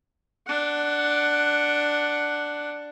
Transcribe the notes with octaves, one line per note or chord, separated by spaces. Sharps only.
D4 F#5